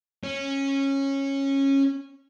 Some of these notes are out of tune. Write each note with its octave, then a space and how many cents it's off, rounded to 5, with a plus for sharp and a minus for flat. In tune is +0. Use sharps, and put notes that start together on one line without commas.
C#4 -15